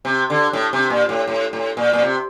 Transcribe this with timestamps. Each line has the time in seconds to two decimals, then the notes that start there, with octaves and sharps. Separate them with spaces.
0.05 C3
0.30 D3
0.53 A2
0.73 C3
0.90 A#2
1.09 A2
1.27 A2
1.53 A2
1.77 A#2
1.94 A#2
2.02 C3